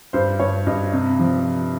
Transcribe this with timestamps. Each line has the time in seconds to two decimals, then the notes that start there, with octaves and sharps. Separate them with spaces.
0.13 G2 C5
0.40 G2 C#5
0.67 G2 D#5
0.93 C3
1.19 F3